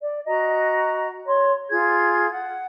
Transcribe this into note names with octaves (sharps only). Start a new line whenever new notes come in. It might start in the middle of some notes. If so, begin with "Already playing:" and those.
D5
F#4 D#5 A#5
C#5 C6
F4 G#4 G#6
F#5